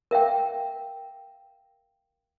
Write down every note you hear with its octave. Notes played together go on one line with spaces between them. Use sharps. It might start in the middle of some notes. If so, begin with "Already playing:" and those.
A#4 E5 F5 G5